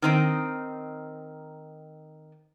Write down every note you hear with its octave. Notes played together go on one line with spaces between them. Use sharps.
D#3 C4 D#4